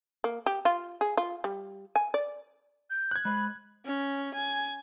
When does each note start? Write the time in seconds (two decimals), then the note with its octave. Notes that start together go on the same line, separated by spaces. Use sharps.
0.24 A#3
0.46 G4
0.65 F4
1.01 G#4
1.17 F4
1.44 G3
1.96 G#5
2.14 D5
2.90 G6
3.11 F#6 G#6
3.25 G#3 C5 D#5 B5
3.86 C#4
4.34 G#5